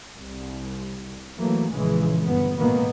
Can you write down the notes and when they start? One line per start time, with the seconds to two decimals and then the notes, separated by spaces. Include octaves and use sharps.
0.17 C2
1.36 E3 F#3 A3 A#3
1.71 A#1 C#3 E3 G#3
2.23 G1 B3
2.57 A1 G#2 B2 D#3 A#3 B3